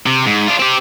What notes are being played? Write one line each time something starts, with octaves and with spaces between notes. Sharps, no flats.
C3
G#2
D4 F4
C4 G4